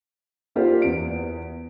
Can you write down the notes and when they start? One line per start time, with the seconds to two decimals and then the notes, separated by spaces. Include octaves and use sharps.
0.55 A#3 F4 G4 A#4 C5 D5
0.82 E2 D7